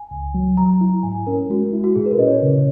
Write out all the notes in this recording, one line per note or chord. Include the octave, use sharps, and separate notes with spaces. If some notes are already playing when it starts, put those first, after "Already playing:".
Already playing: G#5
C#2
F#3
F#3 A#5
E4
G#2 G#5
C#4 A#4
G#3 F#4
E4
F#4
A#2 G#4
B4
A#4
C#4 D#5
C#5
C#3